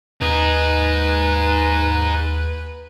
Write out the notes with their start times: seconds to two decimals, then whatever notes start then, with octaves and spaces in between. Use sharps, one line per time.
0.22 D#2 D#4 G#4 B4